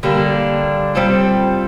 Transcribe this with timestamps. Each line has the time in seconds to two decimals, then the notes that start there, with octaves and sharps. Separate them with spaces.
0.03 D3 G3 A#3 D4
0.95 G3 C4 F4 A4